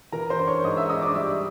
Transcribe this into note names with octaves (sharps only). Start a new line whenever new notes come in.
E3 A#4 A#5
C5 C6
D4
C#5 C#6
G#2 D#5 D#6
E5 E6
D4 D#5 D#6
D5 D6
G3 E5 E6